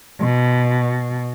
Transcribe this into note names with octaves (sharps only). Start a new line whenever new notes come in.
B2